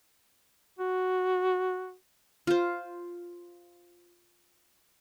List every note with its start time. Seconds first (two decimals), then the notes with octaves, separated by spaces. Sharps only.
0.79 F#4
2.47 F4 C5